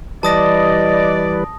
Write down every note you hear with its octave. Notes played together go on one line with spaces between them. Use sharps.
E3 G3 B4 D5 D#5 A5 D#6 A#6